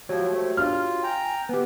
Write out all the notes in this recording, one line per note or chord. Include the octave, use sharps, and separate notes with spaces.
F3 F#4 G4 C#5
A3 C5
D4 F4 F6
G5 G#5 A#5
B3 G4 B4